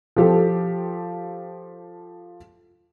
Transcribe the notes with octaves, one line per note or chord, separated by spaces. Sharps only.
F3 G4 A4